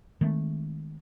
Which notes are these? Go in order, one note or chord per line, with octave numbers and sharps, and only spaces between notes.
D#3 G#3 A3 C4